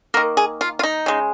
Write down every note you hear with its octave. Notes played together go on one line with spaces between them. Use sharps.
D#3 A#3 A#4
G#4
F4
F4
D#4
C#3 G#3